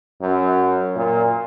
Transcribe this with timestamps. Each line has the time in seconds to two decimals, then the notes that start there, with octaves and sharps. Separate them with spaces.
0.21 F#2
0.96 A#2